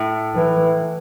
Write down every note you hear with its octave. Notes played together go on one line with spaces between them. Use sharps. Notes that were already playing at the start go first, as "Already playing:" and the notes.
Already playing: A2
E3